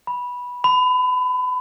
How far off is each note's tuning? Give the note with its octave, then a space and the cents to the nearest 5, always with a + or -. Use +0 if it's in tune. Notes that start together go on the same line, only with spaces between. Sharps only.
B5 -10
B5 +30